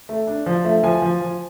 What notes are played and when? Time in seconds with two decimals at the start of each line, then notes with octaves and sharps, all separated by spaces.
0.09 A3
0.27 D4
0.46 F3
0.64 A3
0.83 F3 G#5
1.02 F3
1.21 F3